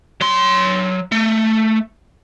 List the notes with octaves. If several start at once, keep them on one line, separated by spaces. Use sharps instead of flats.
F#3 C6
A3